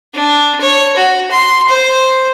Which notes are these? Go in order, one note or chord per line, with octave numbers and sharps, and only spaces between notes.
D4
C#5
F#4
C6
C5